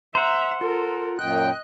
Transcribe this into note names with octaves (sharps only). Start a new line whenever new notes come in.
C5 E5 F#5 A#5
F4 A4 A#4
F#2 A#2 D#5 G5 F#6